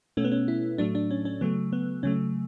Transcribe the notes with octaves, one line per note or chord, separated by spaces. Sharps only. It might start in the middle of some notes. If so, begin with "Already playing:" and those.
B2 A3 C#4
B3
C#4
E4
A2 F#3 A3 D4
D4
C#4
C#4
C#3 F#3 A3 B3
B3
C#3 F#3 A3 C#4